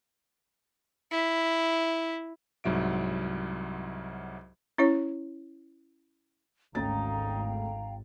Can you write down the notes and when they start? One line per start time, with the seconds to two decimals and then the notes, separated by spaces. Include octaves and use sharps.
1.11 E4
2.64 C2 G#2 F#3 E5 D7
4.78 C#4 E4 C#5
6.75 G#1 D2 C#4 D#4 F5 G5 A#5 A6